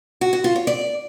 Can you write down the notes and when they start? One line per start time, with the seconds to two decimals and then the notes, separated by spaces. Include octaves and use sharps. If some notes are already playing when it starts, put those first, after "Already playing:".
0.21 F#4
0.33 F#4
0.44 F4
0.56 C#5
0.67 D5